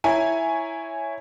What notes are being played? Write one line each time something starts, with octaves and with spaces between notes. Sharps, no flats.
E4 C#5 G#5 A#5